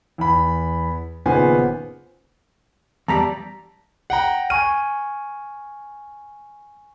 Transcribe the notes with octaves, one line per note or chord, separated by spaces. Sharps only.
E2 B5
F#1 A#2 D#3 B3 C5 G#5
E2 G3 D5 A5 A#5 B6
F#5 G5 A#5
G#5 C#6 F6 D#7